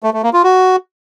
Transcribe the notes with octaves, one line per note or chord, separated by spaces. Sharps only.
A3
A3
A#3
F4
F#4